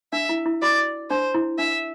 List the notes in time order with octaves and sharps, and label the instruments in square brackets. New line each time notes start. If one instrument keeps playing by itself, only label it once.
[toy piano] D4 [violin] E5
[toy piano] E4
E4
[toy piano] F#4 [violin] D5
[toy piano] D4 [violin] C5
[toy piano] E4
[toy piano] D4 [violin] E5